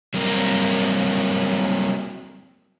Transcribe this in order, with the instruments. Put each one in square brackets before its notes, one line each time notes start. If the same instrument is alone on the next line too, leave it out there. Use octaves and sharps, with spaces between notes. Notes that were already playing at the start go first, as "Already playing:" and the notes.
[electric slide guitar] F#3 G3 A#3 C4 A#4